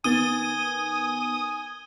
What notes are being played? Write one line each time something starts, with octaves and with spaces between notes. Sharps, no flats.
D#3 B3 G#5 D#6 A6 D#7 G7